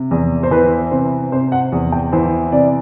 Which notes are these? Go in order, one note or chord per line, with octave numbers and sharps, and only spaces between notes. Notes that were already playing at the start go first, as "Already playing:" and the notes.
Already playing: C3
E2
C5
E3 B4
C3 C5
C3 C5
F#5
E2
G5
E3 C5
C3 D5